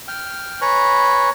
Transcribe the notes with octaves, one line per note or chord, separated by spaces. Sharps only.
G5 F6
B4 C#5 G#5 A#5 B5 C#6